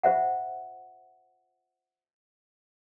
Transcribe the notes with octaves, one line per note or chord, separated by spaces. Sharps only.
F4 C5 E5 F#5